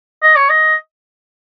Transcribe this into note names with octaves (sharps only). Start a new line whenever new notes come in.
D#5
C#5
D#5